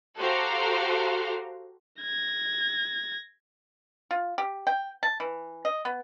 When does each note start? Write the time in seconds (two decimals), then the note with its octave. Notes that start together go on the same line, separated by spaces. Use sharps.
0.18 F#4 G4 A4 C5 F5 A#5
2.02 G#6 A#6
4.11 F4
4.38 G4
4.67 G5
5.03 A5
5.20 E3
5.65 D#5
5.85 B3